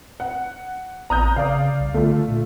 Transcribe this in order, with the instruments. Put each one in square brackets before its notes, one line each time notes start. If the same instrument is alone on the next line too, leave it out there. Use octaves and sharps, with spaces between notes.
[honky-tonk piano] F#5
[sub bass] A1 [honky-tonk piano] A#5 D#6 G6
[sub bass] C#3 [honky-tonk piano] D5 F5
[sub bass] C2
[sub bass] D3 [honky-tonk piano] A3 F4
[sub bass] A#2